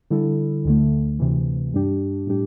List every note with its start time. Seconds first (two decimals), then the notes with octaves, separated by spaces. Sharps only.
0.10 D3 G3 E4 A4
0.65 D2 D3 A3
1.19 D2 C3 E3
1.74 G2 G3 D4 G4
2.27 A2 G3 D4 G4